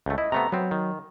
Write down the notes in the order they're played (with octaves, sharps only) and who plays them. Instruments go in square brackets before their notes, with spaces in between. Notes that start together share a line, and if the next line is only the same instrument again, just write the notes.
[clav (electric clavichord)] C#2 A3
[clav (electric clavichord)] E4 [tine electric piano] D#5
[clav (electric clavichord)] C3 A3 B3 [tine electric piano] A#5
[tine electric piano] F#3 [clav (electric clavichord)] B3 C4
[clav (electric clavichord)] D#3